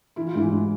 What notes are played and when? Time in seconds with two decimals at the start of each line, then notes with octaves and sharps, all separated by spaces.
0.16 E3 E4
0.27 F4
0.35 G#2 E3 E4
0.51 G#2